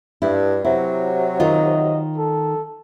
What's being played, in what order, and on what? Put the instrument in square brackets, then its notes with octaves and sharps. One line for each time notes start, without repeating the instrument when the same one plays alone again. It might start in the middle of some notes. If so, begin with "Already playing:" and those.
[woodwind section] G2 [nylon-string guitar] E4
[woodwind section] C3 F#3 [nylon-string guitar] E4
[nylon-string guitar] D#3 D#4 F4 [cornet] D#5
[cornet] A4